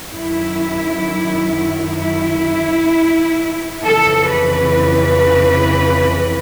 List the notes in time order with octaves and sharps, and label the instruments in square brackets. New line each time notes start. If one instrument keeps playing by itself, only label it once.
[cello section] F#2 D#3 E4
E4
F2 C#3 E3 A4
B4